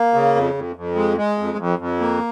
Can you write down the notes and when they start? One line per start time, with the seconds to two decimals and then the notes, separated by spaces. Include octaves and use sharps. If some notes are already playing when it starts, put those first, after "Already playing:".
Already playing: A#3
0.14 C#3
0.35 F2
0.54 F2
0.76 F2
0.96 G#3
1.17 G#3
1.38 F2
1.58 F2
1.79 F2
2.00 A#3